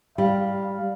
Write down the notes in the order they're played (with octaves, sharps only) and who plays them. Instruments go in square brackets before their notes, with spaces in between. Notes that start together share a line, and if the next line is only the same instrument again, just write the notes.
[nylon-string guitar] G3 [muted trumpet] F5